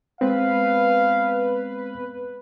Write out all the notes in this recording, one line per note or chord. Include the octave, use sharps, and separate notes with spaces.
G#3 B3 C4 B4 F5